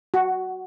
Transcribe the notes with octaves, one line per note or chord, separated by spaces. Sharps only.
F#4